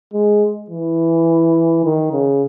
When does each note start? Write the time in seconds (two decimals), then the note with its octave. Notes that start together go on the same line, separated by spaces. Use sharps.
0.14 G#3
0.70 E3
1.85 D#3
2.13 C#3